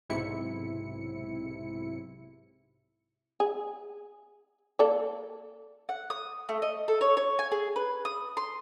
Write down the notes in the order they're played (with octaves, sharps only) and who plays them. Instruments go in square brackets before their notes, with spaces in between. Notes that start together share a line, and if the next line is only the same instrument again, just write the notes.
[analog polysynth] B1 G#2 C3 E4 C#7
[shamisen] G#4
A#3 A4 D5
[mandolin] F#5
D#6
A3
D#5
A4
C#5
C#5
G#5
G#4
B4
D#6
C6